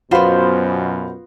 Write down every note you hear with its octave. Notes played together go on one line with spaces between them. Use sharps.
F#2 B2 B3 F4 F#4 C5 F5 B5